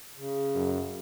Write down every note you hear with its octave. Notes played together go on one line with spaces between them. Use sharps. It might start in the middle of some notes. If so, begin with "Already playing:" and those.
C#3
F#2